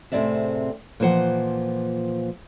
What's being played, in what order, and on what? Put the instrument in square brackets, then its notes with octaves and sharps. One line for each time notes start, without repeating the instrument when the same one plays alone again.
[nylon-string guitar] A2 C3 C4 G#4 D5 E5
A#2 E3 F3 C5 F#5